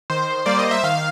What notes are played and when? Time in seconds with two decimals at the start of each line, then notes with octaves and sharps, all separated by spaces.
0.10 D#3 C5
0.46 G3 A#3 D5
0.59 D#5
0.71 E5
0.83 D#3 F5